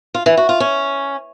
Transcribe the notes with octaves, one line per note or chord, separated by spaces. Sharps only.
F4
E3
F#4
F4
C#4